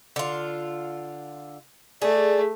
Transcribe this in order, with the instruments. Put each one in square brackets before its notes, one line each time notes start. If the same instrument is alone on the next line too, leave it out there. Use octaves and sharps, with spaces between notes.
[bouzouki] D3 F4
[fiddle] A3 [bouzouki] G#4 [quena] D5